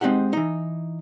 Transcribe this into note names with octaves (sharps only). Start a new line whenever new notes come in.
G#3 C4 D#4 G4 F#5
E3 D#4